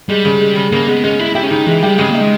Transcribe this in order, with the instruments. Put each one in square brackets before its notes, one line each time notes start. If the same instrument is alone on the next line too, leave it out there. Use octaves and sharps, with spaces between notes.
[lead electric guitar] G3 [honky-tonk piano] G#3
[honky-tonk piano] C#3
G#3
C#3
[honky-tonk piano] C#3 [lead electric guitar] A#3
[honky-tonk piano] G#3 [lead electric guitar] B3
[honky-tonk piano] G#3 [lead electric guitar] C#4
[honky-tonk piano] G#3 [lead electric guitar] E4
[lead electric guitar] E4 [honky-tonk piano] G4
[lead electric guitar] C#4
[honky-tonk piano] C#3 [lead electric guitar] D#4
[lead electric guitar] E3 [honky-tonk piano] G#3
[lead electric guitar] G3 [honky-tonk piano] G4
[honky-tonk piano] C#3 [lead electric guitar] G#3
[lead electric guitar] A#3 [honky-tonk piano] D#4
[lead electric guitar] G#3